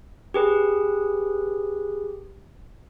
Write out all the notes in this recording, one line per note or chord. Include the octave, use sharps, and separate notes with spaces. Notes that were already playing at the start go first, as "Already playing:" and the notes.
G4 G#4 B4